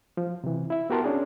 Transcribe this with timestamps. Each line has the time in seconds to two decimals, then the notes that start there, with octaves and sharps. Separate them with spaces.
0.17 F3
0.44 C3 E3
0.70 E4 E5
0.90 B3 F#4 G4 A#4 A5 C6
1.04 C#4 D4 G#4